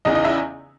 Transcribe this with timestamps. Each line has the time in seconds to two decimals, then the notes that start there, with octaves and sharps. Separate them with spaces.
0.05 E2 C#3 E3 D#4 D#5
0.15 D#4 D#5
0.25 E4 E5